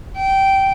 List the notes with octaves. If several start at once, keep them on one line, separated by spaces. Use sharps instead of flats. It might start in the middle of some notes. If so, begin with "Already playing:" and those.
G5